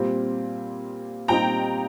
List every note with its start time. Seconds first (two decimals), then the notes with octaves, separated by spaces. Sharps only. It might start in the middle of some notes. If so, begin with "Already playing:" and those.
Already playing: A#2 G3 C4
1.28 A#2 G3 C4 D#4 G4 G5 A#5